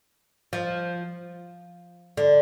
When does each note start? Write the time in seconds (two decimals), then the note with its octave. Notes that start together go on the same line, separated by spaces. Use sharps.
0.53 F3
2.17 D3